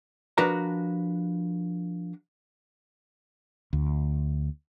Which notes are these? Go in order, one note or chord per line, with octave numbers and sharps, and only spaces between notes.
F3 D4 F#4 A#4 B4 A#5
D2